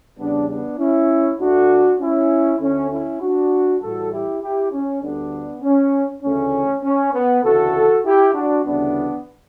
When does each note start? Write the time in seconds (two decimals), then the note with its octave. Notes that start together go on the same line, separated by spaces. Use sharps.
0.18 E2 C#3 G3 B3 D4
0.49 B3 D4
0.78 C#4 E4
1.39 D2 D3 A3 D4 F#4
2.00 C#4 E4
2.60 D2 D3 A3 C#4
2.90 C#4 E4
3.20 D4 F#4
3.81 A2 E3 G3 F#4 A4
4.12 E4 G4
4.42 E4 G4
4.72 C#4
5.02 D2 D3 G3 B3 D4
5.63 C#4
6.22 D2 C#3 E3 A3 C#4
6.84 C#4
7.13 B3
7.43 D2 C#3 E3 F#4 A4
8.05 E4 G4
8.34 D4 F#4
8.65 D2 C#3 E3 G3 B3 D4